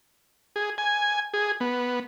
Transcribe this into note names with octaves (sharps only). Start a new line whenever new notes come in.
G#4
G#5
G#4
B3